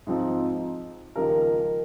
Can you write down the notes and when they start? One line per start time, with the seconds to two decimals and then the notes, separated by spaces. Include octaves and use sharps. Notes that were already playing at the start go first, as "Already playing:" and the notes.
0.07 G#2 F3 C4 D#4
1.16 D#2 C#3 F3 G#3 D#4 G4 A#4